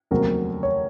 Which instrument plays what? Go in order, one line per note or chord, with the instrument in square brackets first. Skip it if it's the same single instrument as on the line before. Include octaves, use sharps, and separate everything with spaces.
[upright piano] F1 D#2 C#3 F#3 C4 [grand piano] A#4
[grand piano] C#5